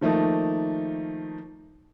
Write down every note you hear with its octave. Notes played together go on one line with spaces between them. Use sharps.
D#3 F3 A3 A#3 D#4